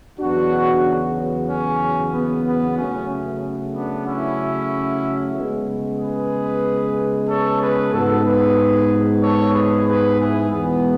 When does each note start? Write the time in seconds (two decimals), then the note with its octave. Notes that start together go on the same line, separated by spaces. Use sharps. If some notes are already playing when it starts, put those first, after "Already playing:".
0.19 E2 C#3 F#3 B3 D4 F#4
1.48 C#4
2.12 B3
2.45 B3
2.77 C#3 F#3 A3 C#4
3.74 B3 D4
4.06 C#4 E4
5.35 C#3 G#3 B3
5.99 G#4 B4
7.28 A4 C#5
7.61 G#4 B4
7.93 G#2 G#3 B3 F#4 A4
8.25 G#4 B4
9.22 A4 C#5
9.54 G#4 B4
9.86 G#4 B4
10.19 E4 G#4
10.50 E2 B2 G#3 B3